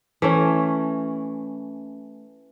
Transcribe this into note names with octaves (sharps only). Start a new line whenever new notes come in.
E3 A3 C#4